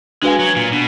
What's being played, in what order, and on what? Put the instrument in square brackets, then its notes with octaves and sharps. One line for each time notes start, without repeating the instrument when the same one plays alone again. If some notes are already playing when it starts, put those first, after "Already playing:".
[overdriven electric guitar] G#3 [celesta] D4 F#4 B4 F5 G#5
[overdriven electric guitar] F#3
A#2
[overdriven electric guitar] B2 [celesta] D4